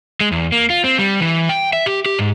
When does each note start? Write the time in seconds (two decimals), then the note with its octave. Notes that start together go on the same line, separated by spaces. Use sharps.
0.21 G#3
0.32 E2
0.52 A#3
0.70 F4
0.84 C4
0.98 G3
1.20 E3
1.49 G5
1.73 E5
1.86 G4
2.06 G4
2.19 G#2